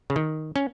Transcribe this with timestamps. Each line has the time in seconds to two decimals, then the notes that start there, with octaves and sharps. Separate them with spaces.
0.10 C#3
0.16 D#3
0.56 C#4